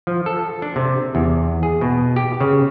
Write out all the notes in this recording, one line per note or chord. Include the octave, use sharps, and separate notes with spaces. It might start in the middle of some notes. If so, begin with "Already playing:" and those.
F3
A4
D4
C3
E2
G#4
B2
G4
C#3